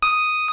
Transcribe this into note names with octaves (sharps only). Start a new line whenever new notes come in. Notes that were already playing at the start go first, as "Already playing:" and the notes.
D#6